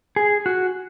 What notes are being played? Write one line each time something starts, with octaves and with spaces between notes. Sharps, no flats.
G#4
F#4